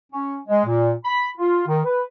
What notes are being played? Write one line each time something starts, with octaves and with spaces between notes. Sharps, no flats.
C#4
G#3
A#2
B5
F4
D#3
B4